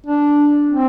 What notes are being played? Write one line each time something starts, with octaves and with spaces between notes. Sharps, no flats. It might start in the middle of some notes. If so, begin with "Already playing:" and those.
D4
C4